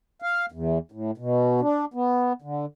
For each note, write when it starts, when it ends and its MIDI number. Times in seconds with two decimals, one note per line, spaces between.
0.22 0.46 77
0.52 0.78 40
0.92 1.11 45
1.18 1.61 47
1.61 1.85 62
1.94 2.33 59
2.42 2.66 50